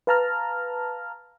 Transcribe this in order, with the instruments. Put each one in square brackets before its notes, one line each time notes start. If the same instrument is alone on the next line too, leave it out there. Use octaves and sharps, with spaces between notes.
[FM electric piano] B4 F5 A5 A#5 F6